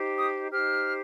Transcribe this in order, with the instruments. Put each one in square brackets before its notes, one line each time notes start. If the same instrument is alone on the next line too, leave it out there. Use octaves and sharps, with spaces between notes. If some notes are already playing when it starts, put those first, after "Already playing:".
Already playing: [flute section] D#4 G4 C5
D#6
D#4 G4 C5 F6